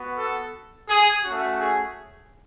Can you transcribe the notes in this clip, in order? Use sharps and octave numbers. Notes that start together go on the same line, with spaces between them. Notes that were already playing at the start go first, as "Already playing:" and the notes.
Already playing: B3 F#4
A4
G#4
A3 C#4 F#4
G#4